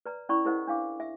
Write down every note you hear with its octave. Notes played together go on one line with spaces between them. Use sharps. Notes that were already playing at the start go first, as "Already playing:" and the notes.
B4 D5 A#5
C#4 E4 D5 B5 C#6
E4 G#4 A#4 C5 D#5 F#5
D4 E4 F5 D6
E5